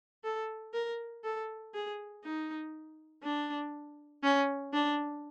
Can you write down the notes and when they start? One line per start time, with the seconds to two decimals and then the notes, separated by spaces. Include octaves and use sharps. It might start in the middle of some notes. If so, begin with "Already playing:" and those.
0.24 A4
0.74 A#4
1.24 A4
1.74 G#4
2.24 D#4
3.23 D4
4.23 C#4
4.73 D4